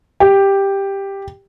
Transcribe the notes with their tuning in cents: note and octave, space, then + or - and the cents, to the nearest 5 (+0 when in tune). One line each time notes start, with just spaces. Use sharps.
G4 +5